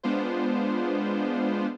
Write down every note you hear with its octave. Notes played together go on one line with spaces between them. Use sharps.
G#3 B3 D4 F4 C5